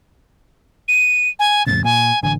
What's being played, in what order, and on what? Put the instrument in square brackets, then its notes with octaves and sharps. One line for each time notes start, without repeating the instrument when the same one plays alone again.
[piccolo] D#7
G#5
[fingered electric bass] F2 A2 C#3 [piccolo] A6
[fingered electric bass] A#2 [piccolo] G#5
[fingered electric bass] A1 D3 [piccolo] G#5